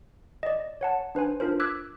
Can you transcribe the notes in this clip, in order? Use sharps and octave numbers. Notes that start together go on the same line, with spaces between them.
D5 D#5
C#5 F#5 A5
D4 B4 C5 G#5
D4 F4 A#4 C5
D6 E6 F#6 G#6 B6